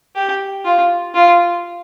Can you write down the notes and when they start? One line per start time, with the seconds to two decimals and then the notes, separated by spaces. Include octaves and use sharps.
0.16 G4
0.65 F4
1.14 F4